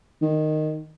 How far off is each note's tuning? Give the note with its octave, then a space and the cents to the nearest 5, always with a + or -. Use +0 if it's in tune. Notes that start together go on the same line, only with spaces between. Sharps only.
D#3 -10